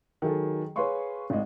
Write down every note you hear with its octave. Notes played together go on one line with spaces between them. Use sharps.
D#3 F#3 G#4 A4
G#4 B4 C#5 F5 C6 C#6
G#1 G#3